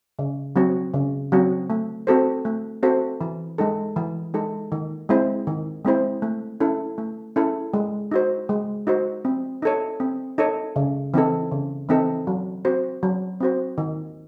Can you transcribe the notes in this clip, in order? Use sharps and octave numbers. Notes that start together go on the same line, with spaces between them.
C#3
F#3 C4 F#4
C#3
F#3 C4 F#4
A3
C4 F#4 A4 C5
A3
C4 F#4 A4 C5
E3
G#3 D#4 A4
E3
G#3 D#4 A4
D#3
G#3 C4 E4 C5
D#3
G#3 C4 E4 C5
A3
C#4 E4 A4
A3
C#4 E4 A4
G#3
D#4 F#4 C5
G#3
D#4 F#4 C5
C4
D#4 A4 C#5
C4
D#4 A4 C#5
C#3
E3 C4 D#4 A4
C#3
E3 C4 D#4 A4
F#3
C4 F#4 C5
F#3
C4 F#4 C5
D#3